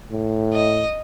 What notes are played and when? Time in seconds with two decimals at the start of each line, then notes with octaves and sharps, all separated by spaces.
0.11 A2
0.53 D#5